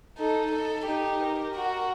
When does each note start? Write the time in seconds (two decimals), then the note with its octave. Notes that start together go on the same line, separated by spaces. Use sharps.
0.18 D#4 A4
0.52 A4
0.86 D#4 G4
1.20 A#4
1.55 F#4